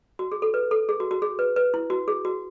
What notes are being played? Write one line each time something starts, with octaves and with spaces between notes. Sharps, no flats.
F#4
G#4
A4
B4
A4
G#4
F#4
F#4
G#4
B4
B4
E4
F#4
G#4
F#4